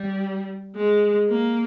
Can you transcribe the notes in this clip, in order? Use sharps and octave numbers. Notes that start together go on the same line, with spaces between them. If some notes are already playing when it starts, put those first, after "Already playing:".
Already playing: G3
G#3
A#3